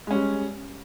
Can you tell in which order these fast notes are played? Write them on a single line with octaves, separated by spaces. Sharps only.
G#3 C#4 G3